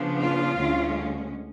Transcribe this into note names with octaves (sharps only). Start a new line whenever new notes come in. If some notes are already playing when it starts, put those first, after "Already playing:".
Already playing: C#3 F3 B3 D4
F4 F5
D2 D3 G#3 C#4